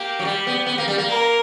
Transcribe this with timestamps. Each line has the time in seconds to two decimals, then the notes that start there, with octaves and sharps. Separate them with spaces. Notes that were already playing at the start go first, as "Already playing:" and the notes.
Already playing: A#3 G4
0.19 F#3
0.25 G3
0.47 B3
0.66 B3
0.78 A#3
0.88 G3
0.98 A#3
1.09 A#4